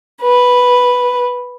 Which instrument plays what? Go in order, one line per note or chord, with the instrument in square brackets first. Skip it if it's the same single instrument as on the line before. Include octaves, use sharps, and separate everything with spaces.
[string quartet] B4